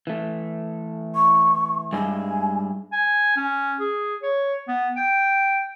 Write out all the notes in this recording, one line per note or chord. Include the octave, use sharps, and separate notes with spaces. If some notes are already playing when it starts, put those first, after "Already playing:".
E3 A3
C#6
G2 G#3 E4 G#5
G#5
C#4
G#4
C#5
B3
G5